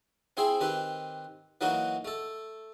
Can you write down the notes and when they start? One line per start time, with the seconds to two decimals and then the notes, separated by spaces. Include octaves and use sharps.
0.37 C4 E4 G#4 C5 G5
0.61 D#3 C4 G4 B4
1.61 E3 F#3 A#3 D#4 F#4
2.05 A3 A4